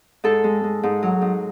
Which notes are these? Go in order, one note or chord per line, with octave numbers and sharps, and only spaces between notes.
G#2 A4
G#3
G#3
G#2
F#3
G#2